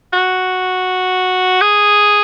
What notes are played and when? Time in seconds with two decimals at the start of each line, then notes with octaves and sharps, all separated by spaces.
0.13 F#4
1.61 G#4